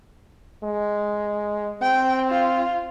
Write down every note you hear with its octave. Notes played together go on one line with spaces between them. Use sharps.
G#3
C4 G5
F4